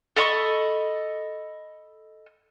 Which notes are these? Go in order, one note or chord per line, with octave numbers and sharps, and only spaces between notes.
A4 D#5 B5 C#6